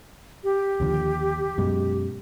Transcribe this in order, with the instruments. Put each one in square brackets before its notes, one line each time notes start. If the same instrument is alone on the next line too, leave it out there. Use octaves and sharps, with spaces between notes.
[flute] G4
[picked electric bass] D#2 D3 F3
F#2 B2 G#3